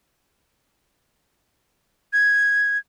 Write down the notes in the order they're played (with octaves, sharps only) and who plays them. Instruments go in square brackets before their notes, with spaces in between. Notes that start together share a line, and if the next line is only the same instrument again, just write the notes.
[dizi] G#6